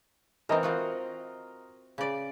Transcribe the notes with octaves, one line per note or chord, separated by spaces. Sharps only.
E3 C4 A#4 D#5 A#5
C4 F4 F#4
C#3 D5